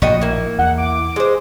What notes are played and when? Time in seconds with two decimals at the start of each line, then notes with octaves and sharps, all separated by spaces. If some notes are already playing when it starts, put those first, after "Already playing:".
0.02 A#1 A2 F#4 D#5 G5
0.21 A#3 E4
0.59 E2 F#5
0.78 D6
1.16 G#3 C5